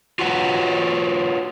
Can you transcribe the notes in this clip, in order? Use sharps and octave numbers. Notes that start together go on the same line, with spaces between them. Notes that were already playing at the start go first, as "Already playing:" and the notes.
F4 F#4 B4 C#5 F#5